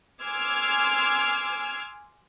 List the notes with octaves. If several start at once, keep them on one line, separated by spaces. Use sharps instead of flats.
G#5 C6 D6 E6 F6 G#6